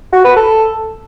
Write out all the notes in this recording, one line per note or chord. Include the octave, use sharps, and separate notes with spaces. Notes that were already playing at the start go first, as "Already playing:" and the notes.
F#4
B4
A4